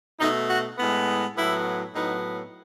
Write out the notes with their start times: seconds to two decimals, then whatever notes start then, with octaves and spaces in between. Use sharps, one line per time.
0.20 B2 A3 D#4
0.49 F#4
0.78 A2 G#3 B3
1.36 A2 F#3 B3 E4
1.95 A2 F#3 B3 D#4